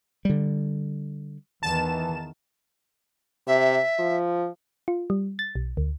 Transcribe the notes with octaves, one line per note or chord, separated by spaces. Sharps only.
D3 G3
E2 D#3 E3 A5 E7
C3 E5
F3
F4
G3
A6
B1
D2